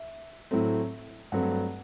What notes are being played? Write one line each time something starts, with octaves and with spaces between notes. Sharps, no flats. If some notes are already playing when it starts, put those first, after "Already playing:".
Already playing: E5
A2 F#3 A3 C4
G2 F#3 A3 C4 F#5